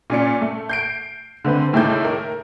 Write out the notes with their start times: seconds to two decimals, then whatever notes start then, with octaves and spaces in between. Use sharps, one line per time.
0.10 A#2 C#4 D5 C#7
0.41 A3
0.69 G6 C7 D7
1.45 D3 A3 C4 B4 C5
1.73 C#2 A2 D#3 A3 D6 G6
2.05 A#4